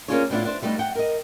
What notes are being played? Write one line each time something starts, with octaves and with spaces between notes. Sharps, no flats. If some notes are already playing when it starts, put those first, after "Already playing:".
A#3 C#4 D4 F4 G#4 C#5
A2 G3 B3 D4 E4 F4
D4 C5
G3 A3 B3 D4 D#4
F#5 G5
A#4 D#5